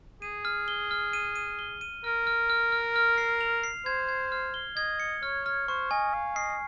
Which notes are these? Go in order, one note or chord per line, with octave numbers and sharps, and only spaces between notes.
G#4 D#7
F6
G7
F6
D#7
D#7
G7
D#7
A#4 F6
F6
F6
F6
F6
C7
F7
C7
C5 G#6
G#6
F6
G7
D#5 G#6
C#7
C#5 F6
F6
C5 C#6
D#5 G#5
F5 G#5
D#5 C7